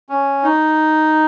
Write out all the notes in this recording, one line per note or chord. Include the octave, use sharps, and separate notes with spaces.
C#4
D#4